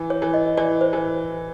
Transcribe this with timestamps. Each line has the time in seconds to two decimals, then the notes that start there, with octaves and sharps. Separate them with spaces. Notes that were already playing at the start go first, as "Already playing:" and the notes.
Already playing: E3
0.10 C#5
0.22 E3
0.34 D#5
0.57 E3 D5
0.81 C5
0.93 E3